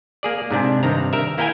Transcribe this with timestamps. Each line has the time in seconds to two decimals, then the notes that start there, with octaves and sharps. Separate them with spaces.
0.23 A#3 G#4 D5
0.51 G#2 C3 D4
0.83 G2 C3 D#3 C4 A#5
1.13 A#4 E5
1.38 A#3 E4 A#4 G5 G#5 A#5